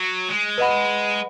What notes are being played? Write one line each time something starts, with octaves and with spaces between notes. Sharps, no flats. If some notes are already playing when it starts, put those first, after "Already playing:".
Already playing: F#3
G#3
B4 D#5 F#5 B5